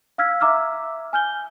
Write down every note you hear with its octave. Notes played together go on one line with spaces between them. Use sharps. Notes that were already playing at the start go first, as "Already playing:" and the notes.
F5 E6 F6 G#6 B6
E5 A#5 D6 E6 F6
G#5 F6 G6 G7